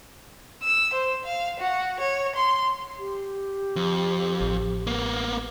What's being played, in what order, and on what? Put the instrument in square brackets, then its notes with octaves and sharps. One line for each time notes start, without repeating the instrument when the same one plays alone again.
[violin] E6
C5
F5
F#4
C#5
C6
[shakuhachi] G4
[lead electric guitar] F2
[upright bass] A1
[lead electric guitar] A#3 B3